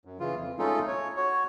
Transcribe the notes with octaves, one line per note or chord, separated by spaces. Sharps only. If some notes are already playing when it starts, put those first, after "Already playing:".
F#2
C#3 E3 F4
F2
G#3 A3 C#4 D#4 F4 A4
C#5
F#4 C#5